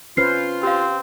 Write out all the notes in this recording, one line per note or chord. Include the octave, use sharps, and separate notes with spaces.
C#4 F4 B4 C5 F6 C7
C4 G4 F5